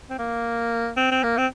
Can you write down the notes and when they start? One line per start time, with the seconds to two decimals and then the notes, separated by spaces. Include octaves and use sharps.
0.10 C4
0.19 A#3
0.97 C4
1.11 C4
1.23 A#3
1.38 C4